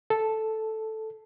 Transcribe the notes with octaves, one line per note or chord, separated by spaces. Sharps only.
A4